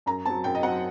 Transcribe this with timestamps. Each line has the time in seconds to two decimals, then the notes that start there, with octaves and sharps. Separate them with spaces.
0.06 F#2 A#5
0.25 F#3 C4 A5
0.44 F#2 G5
0.55 D#5
0.62 C4 F#5
0.66 F#3